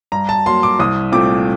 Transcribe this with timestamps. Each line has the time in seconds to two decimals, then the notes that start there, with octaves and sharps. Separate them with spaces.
0.12 G2 A#5
0.29 A5
0.46 F#3 A#3 C6
0.63 D6
0.79 C2 D#6
1.12 A#2 A3 C4 D6